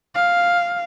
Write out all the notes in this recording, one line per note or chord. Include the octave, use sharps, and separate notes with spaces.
F5